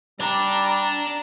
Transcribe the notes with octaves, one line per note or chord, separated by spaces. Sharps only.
G3 D5 A5 A#5